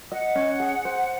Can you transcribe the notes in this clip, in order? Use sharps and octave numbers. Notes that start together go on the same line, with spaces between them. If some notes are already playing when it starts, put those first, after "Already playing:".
D#5 F#5
C#4
G#4
C5